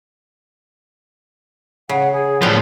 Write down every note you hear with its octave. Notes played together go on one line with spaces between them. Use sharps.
C#3 F#5
G#4
A2 F3 B3 G4 D5